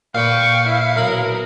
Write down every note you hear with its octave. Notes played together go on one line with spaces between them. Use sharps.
A#2 B4 F5 G5 C#6
E4
B1 A#4 B5